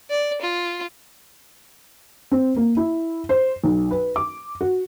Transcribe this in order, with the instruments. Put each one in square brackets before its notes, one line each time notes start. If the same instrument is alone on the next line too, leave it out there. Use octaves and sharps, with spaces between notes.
[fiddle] D5
F4
[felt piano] C4
A#3
E4
C5
B1
B4
D6
F#4